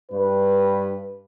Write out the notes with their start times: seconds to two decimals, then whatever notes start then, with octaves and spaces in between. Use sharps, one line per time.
0.12 G2 B4